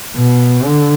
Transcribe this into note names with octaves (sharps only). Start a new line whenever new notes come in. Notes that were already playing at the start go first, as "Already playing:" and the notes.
B2
D3